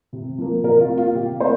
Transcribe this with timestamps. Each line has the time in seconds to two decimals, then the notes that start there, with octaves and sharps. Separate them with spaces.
0.13 C3
0.38 F3 A#3
0.63 C3 A#4
0.80 F4
0.89 A#3
0.98 F4
1.15 C3 G4
1.40 A#3 C5